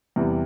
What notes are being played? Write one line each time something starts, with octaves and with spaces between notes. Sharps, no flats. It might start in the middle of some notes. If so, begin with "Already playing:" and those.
E2 C3 E3 G3